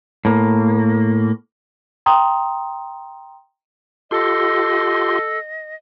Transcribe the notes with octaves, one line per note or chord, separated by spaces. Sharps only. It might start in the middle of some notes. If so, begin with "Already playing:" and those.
A2 A#3
G5 A#5 C6 D#6
F4 G4 A4 D#5 C6